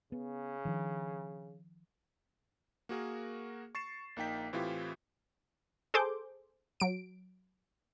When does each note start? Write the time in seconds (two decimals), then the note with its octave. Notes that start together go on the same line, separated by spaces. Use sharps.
0.12 C#3 B3
0.65 D#3 F3 D4
2.89 A#3 F#4 G#4 A#4
3.75 C#6 A6 C7 E7
4.16 A#1 A#3 D#4 G5 B6
4.53 A2 E3 C4 E4 F4 G4
5.94 G#4 A4 C5 D6 G6
6.80 F#3 D7